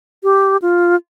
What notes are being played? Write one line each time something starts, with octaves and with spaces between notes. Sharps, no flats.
G4
F4